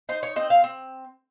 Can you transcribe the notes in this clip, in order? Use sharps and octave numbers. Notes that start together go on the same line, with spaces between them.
D#4 C5
C#5
C4 D#5
F5
C4